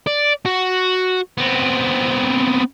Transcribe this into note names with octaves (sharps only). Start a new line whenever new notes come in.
D5
F#4
B3 C4